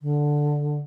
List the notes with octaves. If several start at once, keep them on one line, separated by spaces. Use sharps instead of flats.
D3